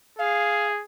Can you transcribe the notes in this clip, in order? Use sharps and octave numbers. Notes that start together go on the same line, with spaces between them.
G#4 F5